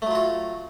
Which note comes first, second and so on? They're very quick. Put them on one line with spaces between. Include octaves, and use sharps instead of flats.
A3 F#3 F4 F#4